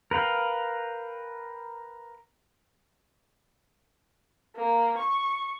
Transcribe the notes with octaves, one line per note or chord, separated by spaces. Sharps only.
A#4 B4 F5 G5
A#3
C#6